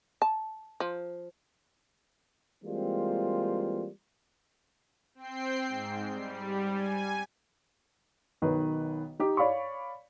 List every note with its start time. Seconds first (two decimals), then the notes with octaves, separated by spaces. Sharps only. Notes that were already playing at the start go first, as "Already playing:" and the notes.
0.22 A5
0.80 F3
2.64 E3 G3 G#3 A#3 C4 F4
5.15 C4 G5 C7
5.68 G#2
6.12 G3
6.73 G#5
8.42 B1 D#3 B4
9.20 D#4 G4
9.37 C#5 D5 F5 B5 C#6